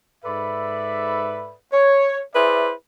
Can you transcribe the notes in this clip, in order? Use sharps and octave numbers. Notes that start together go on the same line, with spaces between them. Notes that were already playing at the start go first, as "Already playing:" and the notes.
G#2 A4 B4 D5 E5 B5
C#5
E4 G#4 B4 C5 D5 E5